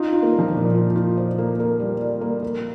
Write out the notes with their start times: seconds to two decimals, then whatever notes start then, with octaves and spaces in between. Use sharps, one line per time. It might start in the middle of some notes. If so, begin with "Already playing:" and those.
Already playing: D#4 F4
0.12 F4
0.22 A#3
0.34 G3
0.39 F3
0.54 A#2 A#3
0.75 F4
0.96 F4
1.17 C5
1.38 A#3
1.59 A#3
1.80 G3
2.02 G3
2.21 A#3
2.43 A#3